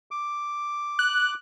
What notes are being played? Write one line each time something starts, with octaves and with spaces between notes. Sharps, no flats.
D6
F#6